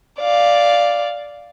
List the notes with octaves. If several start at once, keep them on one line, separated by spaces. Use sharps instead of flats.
D5 F5